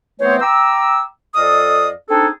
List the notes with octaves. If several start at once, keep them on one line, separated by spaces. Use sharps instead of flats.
E3 A3 B3 C4 C5 C#5
G5 A#5 D6 E6
F2 A4 D5 D#5 F5 D#6
C4 D4 D#4 G#4 A4